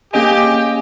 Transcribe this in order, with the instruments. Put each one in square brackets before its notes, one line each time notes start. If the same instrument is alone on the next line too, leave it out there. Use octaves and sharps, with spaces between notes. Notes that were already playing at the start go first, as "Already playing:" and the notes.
[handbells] A#3 C#4 G#4 D#5 G#5 [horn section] G4